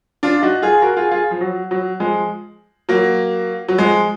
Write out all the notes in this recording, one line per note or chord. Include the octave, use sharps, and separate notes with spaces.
D4 F4
D#4 F#4
F4 G#4
F#4 A#4
F4 G#4
F4 G#4
F3
F#3
F#3
F3 G#3
F#3 A#3
F#3
F3 G#3